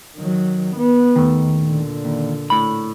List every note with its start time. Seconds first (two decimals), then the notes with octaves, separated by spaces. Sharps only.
0.17 D#3 F#3
0.77 B3
1.16 D#2 D#3 A3
1.61 A#2 D3
2.05 D#2
2.50 A2 B5